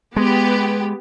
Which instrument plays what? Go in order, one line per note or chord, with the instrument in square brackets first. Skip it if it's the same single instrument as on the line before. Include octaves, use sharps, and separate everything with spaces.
[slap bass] G#3 [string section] B3 G4